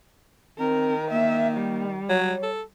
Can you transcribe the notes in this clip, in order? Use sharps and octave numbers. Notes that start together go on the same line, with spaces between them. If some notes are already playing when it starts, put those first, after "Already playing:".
D#3 C4 A#4
A#3 E5
G3
F#3 C#5
A4